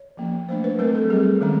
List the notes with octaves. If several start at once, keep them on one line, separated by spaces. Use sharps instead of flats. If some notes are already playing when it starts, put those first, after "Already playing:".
Already playing: C#5
F3 A#3 C#4
F#3 A3 D4 C5
B4
F#3 A3 C4 A#4
A4
G3 C4 G#4
D#3 G#3 C#4